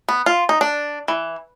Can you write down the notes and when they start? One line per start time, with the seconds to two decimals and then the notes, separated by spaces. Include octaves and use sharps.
0.09 B3
0.26 F4
0.49 D#4
0.61 D4
1.08 E3